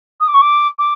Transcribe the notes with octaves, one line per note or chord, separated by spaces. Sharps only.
D#6
D6
C#6
D6
D6